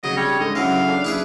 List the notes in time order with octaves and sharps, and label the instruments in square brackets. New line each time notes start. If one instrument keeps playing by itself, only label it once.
[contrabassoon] F1 [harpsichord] C#3 [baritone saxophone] F#3 [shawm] D#5
[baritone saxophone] G3 [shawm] C#5
[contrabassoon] G#2 [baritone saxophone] D3 [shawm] D#5
[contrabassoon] C#3 [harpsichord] E3 F#3 [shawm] F5
[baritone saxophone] D4
[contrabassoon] F#1 [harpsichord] E4 G#4 B4